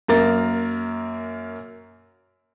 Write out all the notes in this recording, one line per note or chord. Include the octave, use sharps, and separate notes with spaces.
F#2 A#3 A#4 A6